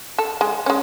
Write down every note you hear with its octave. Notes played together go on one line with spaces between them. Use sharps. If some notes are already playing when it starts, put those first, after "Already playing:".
A4
G#3
G#3 C#4